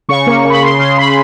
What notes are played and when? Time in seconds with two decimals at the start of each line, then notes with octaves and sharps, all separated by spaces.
0.09 C#3 C#6
0.27 A#3
0.45 C#3
0.50 B5
0.62 C#3 C6
0.79 C#3 C6
0.98 C#3 B5